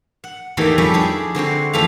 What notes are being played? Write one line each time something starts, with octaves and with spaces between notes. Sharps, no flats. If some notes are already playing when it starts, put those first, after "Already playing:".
F#5
E2 D#3 E3 A3 A#3 G4
F2 G3 A3 C#4 D5 G#5
D4 E4 G4 G#4
D3 C4 F#4 C5
F2 E3 A3 G4 F5